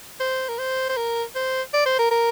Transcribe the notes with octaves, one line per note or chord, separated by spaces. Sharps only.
C5
A#4
C5
C5
A#4
C5
D5
C5
A#4
A#4